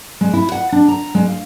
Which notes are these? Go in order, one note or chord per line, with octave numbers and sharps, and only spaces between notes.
G#3
E4
F#5
D4
A#5
G#3
F5